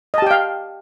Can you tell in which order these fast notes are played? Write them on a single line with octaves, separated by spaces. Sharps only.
D#5 A5 G4 G5 F5